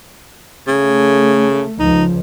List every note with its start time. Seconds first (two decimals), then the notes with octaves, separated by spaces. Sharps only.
0.67 C#3 A3
1.79 C#2 F3 D#4